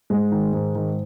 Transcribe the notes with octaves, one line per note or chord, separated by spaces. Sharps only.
G#2 G#3
D#3
G#2
D#3